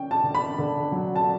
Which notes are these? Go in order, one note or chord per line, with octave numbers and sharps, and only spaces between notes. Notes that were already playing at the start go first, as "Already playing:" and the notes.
Already playing: D3 C#4 G5
A5
D3
B5
D3
F#3
A5